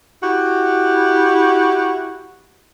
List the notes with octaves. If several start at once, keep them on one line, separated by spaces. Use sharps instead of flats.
E4 F#4 G4